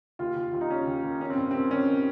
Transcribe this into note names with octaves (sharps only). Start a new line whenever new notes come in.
D#2 F4
D#2
D#2 F4
D#4
C#3 C#4
D#2
D#2
D#3 C#4
C4
G2
D#3 C4
D#3 C#4
D#3